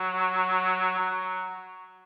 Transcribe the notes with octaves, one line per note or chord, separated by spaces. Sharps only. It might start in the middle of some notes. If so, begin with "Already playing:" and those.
Already playing: F#3
F#3